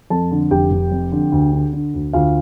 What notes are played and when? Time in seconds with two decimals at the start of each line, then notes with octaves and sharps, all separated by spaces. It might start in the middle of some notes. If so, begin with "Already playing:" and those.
0.10 F2 A4 A5
0.31 D3
0.51 F1 G4 G5
0.72 F1
0.91 F2
1.12 D3
1.32 D2
1.52 D3
1.73 D3
1.94 D2
2.13 D2 F4 F5